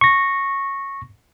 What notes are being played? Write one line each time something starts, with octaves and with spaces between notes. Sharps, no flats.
C#6 A#6